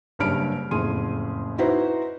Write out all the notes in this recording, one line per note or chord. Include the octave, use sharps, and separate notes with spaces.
F#1 G2 C#4 B5 F6 D7
F#1 F2 A2 G#4 C6 D#7
D#4 E4 F#4 B4 C5